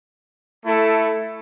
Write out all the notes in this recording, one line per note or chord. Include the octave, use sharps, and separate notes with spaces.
A3 E4 A4